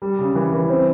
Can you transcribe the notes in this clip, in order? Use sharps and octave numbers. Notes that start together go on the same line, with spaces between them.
G3
C#3
E3
E3
C4